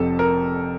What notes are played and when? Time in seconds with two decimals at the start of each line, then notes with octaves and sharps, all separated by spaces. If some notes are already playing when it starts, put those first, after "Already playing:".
Already playing: F1 F2 C3 A4
0.19 A#4